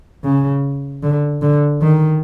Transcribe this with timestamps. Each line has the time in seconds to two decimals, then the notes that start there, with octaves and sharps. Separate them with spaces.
0.24 C#3
1.03 D3
1.42 D3
1.82 D#3